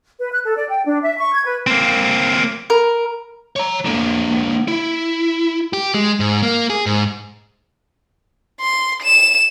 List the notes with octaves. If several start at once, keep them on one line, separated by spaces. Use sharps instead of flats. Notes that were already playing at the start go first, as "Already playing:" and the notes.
B4
F#6
A4
D5
G5
D4
E5
C#6
G#6
B4
A#3 C4
A#4
C#5 A#5
D3 A#3
E4
G4
G#3
G#2
A#3
G#4
G#2
C6
E7